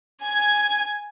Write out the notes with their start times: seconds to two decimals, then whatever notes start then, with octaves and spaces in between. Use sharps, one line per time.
0.22 G#5 G#6